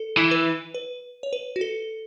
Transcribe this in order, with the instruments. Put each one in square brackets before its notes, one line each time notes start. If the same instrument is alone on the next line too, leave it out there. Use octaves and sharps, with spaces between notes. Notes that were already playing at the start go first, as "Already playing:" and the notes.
Already playing: [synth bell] A4
[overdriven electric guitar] E3
[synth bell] B4
B4
C#5
B4
F#4
A4